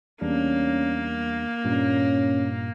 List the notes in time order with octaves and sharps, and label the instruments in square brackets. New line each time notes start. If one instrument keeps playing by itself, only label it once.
[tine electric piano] E2 G3 D4 [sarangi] A#3 [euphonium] C#4
[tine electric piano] G2 A#2 G3 [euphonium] C#4